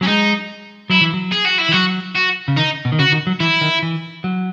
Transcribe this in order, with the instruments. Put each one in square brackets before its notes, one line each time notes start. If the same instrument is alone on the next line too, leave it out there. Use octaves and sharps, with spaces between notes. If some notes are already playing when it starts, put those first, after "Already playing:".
[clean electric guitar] F#3 [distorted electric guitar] C#4
[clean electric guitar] G#3 [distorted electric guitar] D#4
[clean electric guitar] F#3 [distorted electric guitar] E4
[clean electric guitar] E3
F#3
[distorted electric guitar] G#4
F#4
E4
[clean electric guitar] E3
[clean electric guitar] F#3 [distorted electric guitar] F#4
[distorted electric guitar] F#4
[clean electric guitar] C#3
[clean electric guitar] D#3 [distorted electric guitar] D#4
[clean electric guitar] B2
D#3
[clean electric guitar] C#3 [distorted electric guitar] F#4
[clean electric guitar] D#3
F#3
[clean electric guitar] E3 [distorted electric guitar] E4
[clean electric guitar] D#3
E3
F#3